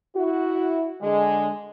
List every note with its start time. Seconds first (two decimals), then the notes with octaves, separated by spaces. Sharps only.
0.16 E4 F#4
1.01 D3 G#3